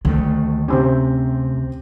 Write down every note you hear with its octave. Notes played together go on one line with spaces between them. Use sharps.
D2 D3 D#3 A3
C3 C4 C#4 G4